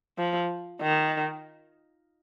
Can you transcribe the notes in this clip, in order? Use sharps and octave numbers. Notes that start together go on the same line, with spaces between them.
F3
D#3